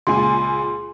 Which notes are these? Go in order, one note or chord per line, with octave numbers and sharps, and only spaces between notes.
C#2 A#2 G#5 C6